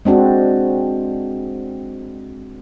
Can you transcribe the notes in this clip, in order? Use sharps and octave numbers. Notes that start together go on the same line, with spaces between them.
G#3 C4 D4 F#4